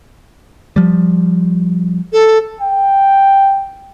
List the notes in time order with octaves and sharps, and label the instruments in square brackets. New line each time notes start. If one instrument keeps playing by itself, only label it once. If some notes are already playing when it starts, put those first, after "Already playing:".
[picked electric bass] F3 G3
[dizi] A4
[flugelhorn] G5